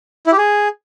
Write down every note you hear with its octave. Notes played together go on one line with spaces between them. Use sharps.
E4
G4
G#4